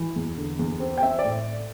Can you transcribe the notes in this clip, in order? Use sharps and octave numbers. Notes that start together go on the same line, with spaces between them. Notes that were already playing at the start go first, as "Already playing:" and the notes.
Already playing: E3
E2
D3
E2
C4
G5
C4 E5
D5
A2